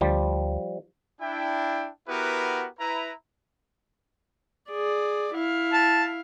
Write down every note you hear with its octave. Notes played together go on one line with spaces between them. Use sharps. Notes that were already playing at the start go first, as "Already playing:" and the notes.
D2 F3 G3
D4 E4 G5
B3 E4 F#4 G4 A#4 B4
E4 B4 A#5
G#4 D5
E4 F5
A5